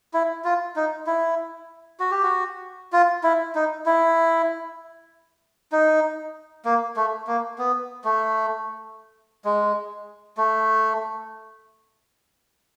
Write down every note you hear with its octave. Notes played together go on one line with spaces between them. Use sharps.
E4
F4
D#4
E4
F#4
G4
F#4
F4
E4
D#4
E4
D#4
A#3
A3
A#3
B3
A3
G#3
A3